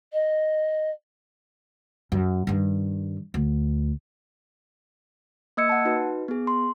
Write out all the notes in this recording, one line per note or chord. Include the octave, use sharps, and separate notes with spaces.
D#5
F#2
G2 D#3
D2
A#3 D#5 E6 G#6 C#7
F#5 A5
D#4 F#4 B4
B3 G#4
C6